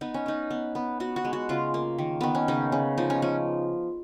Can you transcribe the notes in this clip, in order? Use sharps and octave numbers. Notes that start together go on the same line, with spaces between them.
B3 D#4
C#4
B3 D#4
B3
B3
B3 F#4
F#4
G#3
F#4
C#3 F4
A#3
D#3
D#3 B3
C#4
C#3 D#4
C#3
F3 D#4
C#4
F3 C#4